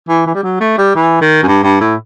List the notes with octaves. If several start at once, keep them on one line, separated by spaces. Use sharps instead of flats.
E3
E3
G3
F#3
A3
G3
E3
D#3
F#2
G2
G2
A2